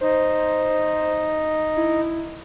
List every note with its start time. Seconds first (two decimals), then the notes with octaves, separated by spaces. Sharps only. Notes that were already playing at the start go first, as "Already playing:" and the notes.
0.01 D#4 C5
1.77 E4